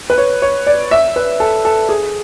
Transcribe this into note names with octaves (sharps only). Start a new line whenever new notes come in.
B4
C#5
C#5
D5
E5
B4
A4
A4
G#4